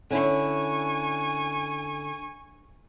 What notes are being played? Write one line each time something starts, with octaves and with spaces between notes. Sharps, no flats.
D3 C#4 E4 G#5 C#6